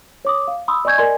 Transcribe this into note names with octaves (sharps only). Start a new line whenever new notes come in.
C#5 D6 D#6
F5
B5 C6 D#6 E6
D5 D#5 G#5 C#6 G6 G#6
A#4 D5 D#5 G#5 C6